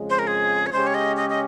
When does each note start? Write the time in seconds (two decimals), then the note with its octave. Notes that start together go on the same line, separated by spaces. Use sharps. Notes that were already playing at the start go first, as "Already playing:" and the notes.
Already playing: F2 C#3 G#3
0.10 C5
0.19 A#4
0.27 G#4
0.67 C#5
0.72 C#3 G#3 C#4 G4 C5
0.87 C#5
0.94 D#5
1.17 D#5
1.30 D#5